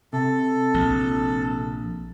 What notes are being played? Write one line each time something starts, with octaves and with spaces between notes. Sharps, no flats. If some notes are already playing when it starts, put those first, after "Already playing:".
C3 A4
A#1